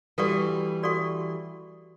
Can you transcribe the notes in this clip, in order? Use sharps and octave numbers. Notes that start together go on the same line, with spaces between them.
E3 G3 F#4 A4 D5 F#5 C#6
F#4 A4 D5 F#5 C#6